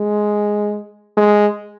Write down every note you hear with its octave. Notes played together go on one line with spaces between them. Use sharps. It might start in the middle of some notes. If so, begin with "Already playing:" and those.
Already playing: G#3
G#3